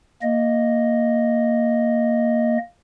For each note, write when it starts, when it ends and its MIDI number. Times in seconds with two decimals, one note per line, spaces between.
0.22 2.58 58
0.22 2.58 75